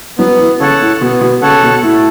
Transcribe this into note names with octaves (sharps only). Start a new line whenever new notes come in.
F#3 B3
E3
C#3 A4 C#5 F#5 A5
A2
B2 B3
B2
C#3 A4 C#5 F#5 A5
B2
A2 A3